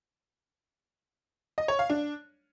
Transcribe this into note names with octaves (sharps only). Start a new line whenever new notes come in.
D#5
C#5
F5
D4